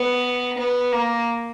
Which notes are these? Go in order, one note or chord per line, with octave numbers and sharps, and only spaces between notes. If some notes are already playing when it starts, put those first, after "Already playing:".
Already playing: B3
B3
A#3